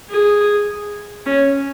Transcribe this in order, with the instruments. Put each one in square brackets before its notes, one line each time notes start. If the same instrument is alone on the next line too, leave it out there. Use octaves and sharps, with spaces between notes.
[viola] G#4
C#4